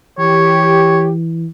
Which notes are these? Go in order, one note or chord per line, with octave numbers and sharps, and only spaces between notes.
E3 G4 C#5